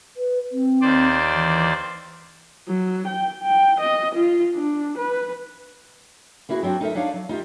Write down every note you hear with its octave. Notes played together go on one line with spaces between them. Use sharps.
B4
C4
D#2 C5 D5
E3
F#3
G5
G5
D#5
F4
D4
B4
A#3 B3 E4 F#4 G#4 B4
F#3 C4 D4 F#4 C5
D#4 A4 A#4 E5
D4 D#4 C#5 D5 F5
F#3
D#4 F4 G4 E5